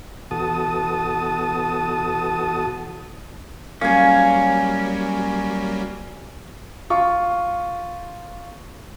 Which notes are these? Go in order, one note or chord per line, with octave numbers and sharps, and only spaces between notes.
E2 B2 F#4 A4 A5 D#6
F#3 G3 A#3 C#4 F5 G#5
F4 C#6